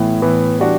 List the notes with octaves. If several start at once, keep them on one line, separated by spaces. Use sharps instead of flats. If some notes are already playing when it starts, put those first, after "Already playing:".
Already playing: A2 E3 B3
A2 E3 B3
E3 G3 D4 F#4